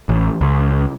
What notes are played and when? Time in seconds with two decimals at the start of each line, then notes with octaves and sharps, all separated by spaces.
0.09 A1
0.41 C#2